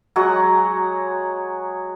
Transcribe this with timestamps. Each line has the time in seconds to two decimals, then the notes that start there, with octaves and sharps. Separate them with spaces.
0.16 F#3 G#3 C#5 F#5